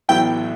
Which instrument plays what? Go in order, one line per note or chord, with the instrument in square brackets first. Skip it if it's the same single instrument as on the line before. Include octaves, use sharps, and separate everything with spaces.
[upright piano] A1 A2 F#3 B3 E4 [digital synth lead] G5